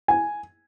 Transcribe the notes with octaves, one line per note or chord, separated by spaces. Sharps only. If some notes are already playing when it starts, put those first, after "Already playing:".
G#5